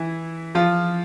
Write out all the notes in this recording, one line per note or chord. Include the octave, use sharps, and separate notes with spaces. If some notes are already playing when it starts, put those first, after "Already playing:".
Already playing: E3 E4
F3 F4